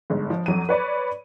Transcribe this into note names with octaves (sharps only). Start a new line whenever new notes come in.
G1 G#2
F3
F2 F#3 D#7
B4 C#5 D5 B5